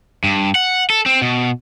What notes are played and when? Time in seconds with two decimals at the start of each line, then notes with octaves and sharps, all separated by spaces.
0.24 G2
0.55 F#5
0.90 A4
1.06 C4
1.22 B2